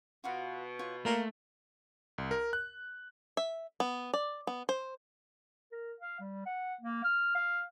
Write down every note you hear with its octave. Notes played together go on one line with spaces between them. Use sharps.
B2 F4 F#4 F5
F4 C#5
A3 A#3 A#4 C5
C2
A#4
F#6
E5
B3
D5
B3
C5
A#4
F5
G3
F#5
A#3
F6
F5